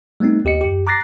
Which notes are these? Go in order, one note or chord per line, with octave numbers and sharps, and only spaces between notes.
G3 A3 B3 C4 D#4
D#2 G4 D#5 C#7
F#2 G4
A#5 D6 F#6 A6 A#6 C7